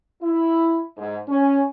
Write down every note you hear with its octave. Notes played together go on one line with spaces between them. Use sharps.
E4
G#2
C#4